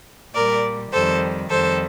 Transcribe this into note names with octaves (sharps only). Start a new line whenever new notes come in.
A#2 G3 A#4 D5
F2 D#3 G3 A4 C5
F2 D#3 G3 A4 C5